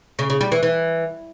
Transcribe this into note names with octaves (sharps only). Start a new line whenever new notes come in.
C#3
C#3
G3
E3
E3